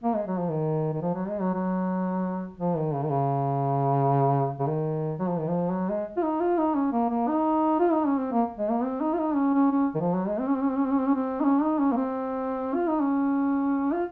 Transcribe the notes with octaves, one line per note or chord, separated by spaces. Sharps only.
A#3
G#3
F#3
F3
D#3
D#3
F3
F#3
G#3
F#3
F#3
F3
D#3
C#3
D#3
C#3
C#3
D#3
F#3
F3
D#3
F3
F#3
G#3
F4
D#4
F4
D#4
C#4
A#3
A#3
D#4
F4
D#4
C#4
C4
A#3
G#3
A#3
C4
D#4
F4
D#4
C#4
C#4
C#4
D#3
F3
F#3
G#3
C4
C#4
C4
C#4
C4
C#4
C4
C#4
C4
C#4
C4
D#4
C#4
D#4
C#4
A#3
C4
F4
D#4
C#4
F4